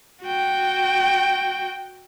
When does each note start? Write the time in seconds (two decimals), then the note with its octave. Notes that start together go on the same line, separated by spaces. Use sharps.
0.25 F#4 G5